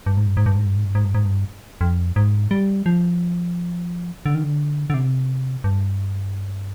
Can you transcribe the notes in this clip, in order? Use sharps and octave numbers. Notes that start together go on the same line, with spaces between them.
G2
G#2
G2
G#2
G2
G#2
G2
G#2
G2
G#2
G2
G#2
G2
F2
G#2
G3
F3
D3
D#3
D3
D3
C3
G2